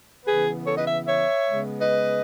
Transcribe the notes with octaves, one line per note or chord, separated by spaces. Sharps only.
C#3 E3 B3 G#4 B4
A4 C#5
B4 D#5
E5
C#5 E5
C#3 G#3 B3
B4 D#5